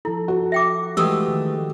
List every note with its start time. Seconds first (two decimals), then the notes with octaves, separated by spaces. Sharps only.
0.05 F3 E4 A4
0.28 F#4
0.52 E5 G5 D6
0.97 E3 G#3 A3 G4 D#6 E6
1.28 D#3